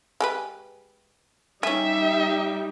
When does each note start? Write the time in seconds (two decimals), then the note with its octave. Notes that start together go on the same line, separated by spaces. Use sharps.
0.21 G#3 G4 B4
1.63 G3 C#4 D#4 G#4 E5 G5